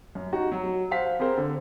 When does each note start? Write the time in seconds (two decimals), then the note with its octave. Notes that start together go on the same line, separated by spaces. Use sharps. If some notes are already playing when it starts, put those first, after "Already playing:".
0.15 F#2
0.33 D#4 F#4
0.52 F#3
0.91 C5 F5 F#5 B6
1.19 C4 G#4 A#4 C5
1.38 D3